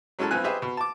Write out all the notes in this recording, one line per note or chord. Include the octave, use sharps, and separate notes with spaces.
F#3 G#3 C#4 E4 A4 A5
B1 F3 C4 B4 G#5 F#6
G4 G#4 B4 C5 D#5 E5
B2
A5 D6